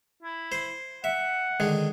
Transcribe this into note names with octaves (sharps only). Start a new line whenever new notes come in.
E4
C5
E5 F#5
D3 D#3 G#3